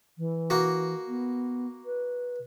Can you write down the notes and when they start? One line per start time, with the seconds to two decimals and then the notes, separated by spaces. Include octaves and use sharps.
0.18 E3
0.50 A#3 F#4
1.08 B3
1.86 B4